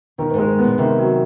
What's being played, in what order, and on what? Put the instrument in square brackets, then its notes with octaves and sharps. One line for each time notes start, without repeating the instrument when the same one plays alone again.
[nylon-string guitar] B2 [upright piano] D#3
[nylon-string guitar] G2
[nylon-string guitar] G#2 [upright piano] G#3
[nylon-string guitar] G#2
[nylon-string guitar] A#2 [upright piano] B3
[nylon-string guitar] C3 [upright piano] D#3
[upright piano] F#3